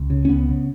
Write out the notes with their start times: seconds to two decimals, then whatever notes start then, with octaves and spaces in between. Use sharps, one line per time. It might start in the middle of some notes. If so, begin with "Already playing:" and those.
Already playing: C#2
0.10 C#3
0.25 C#4
0.29 C#2 B3
0.49 C#3